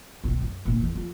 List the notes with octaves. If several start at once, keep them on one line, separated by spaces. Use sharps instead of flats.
B1 D#3
F#2
A#2 D3
E2 E3
F2